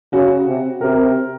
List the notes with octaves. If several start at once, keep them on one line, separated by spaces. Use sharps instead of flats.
C#3 F#4
C3
C3 A#4